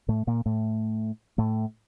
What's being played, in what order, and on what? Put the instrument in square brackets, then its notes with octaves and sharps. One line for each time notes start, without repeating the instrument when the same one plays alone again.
[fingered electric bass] A2 A3
A#2 A#3
A2 A3
A2 A3